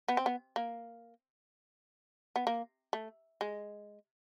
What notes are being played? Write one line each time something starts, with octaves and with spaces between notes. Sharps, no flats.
B3
C4
B3
A#3
B3
A#3
A3
G#3